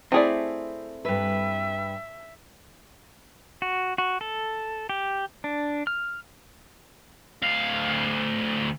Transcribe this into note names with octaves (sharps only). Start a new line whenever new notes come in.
A3 C4 E4 G#4 D5
G2 B4 E5
F#4
F#4
A4
G4
D4
F6
D2 F5